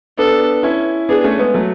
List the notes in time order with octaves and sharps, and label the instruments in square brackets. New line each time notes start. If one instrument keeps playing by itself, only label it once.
[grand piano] B3 D4 [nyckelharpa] A4
[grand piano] C#4 E4
[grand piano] B3 D4 [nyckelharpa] G#4
[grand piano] A3 C#4
G#3 B3
F#3 A3